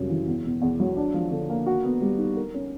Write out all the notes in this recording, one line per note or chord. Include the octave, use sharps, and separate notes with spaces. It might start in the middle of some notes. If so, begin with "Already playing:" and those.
Already playing: F#2 C#3 G3
E3
E2
B2
E2
F#3
D4
F3
D3
A#3
F#4
B3
G3
D#4
A#4
C#4